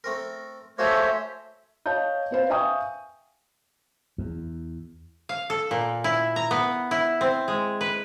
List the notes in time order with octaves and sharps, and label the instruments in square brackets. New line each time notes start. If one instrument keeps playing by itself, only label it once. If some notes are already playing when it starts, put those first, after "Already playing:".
[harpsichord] A3 C4 A#4
[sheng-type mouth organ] A3 C5 C#5 [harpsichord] A#3 F#4 G#4 [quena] E5
[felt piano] C#5 D#5 F5 A5 G6
C4 B4 C5 F5
E5 F5 G5 G#5 C#6 D#6
[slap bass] E2
[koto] F5
A4
A#2
E4
A#5
B3
E4
C4
G#3
B4